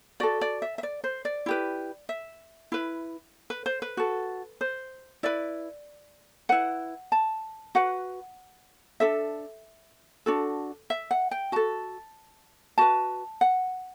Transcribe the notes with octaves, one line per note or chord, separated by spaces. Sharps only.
F#4 A4 D5
D5
E5
E5
D5
C5
D5
E4 G4 B4
E5
E4 B4
B4
C5
B4
F#4 A4
C5
E4 B4 D5
E4 B4 F#5
A5
F#4 B4 F#5
D4 A4 E5
D4 F#4 A4
E5
F#5
G5
F#4 A4 A5
F#4 B4 A5
F#5